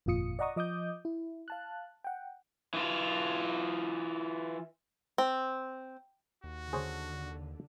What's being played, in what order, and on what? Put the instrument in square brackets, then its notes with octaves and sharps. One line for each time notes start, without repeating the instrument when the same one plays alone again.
[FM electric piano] G1 F2 A#2 F4 D#6 C#7
D5 D#5 F#5 A#5 C#6 D#6
F3 D#5 D6 D#6 G6
E4
F5 A5 F#6
F#5 G5
[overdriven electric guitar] E3 F4
[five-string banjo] C4
[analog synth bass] D#2 [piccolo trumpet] F#4
[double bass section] D3 [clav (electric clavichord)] G#4 C5 C#5